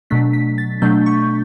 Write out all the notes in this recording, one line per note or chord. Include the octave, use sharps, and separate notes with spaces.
B2 F#3 A3 D4 B6
B6
A6
B2 F#3 A3 D4 G6
C#6